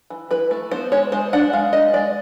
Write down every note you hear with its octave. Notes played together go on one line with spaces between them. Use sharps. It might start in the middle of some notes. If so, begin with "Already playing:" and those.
E3
E3 B4
A3
B3 C5
G#3 C#5
G#3 C5
D4 F#5
G#3 F5
D4 D#5
G#3 D5